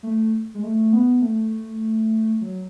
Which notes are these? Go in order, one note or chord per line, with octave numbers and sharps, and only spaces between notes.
A3
G#3
A3
B3
A3
F#3